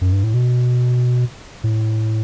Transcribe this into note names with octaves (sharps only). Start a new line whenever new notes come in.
F#2
G2
A2
B2
A2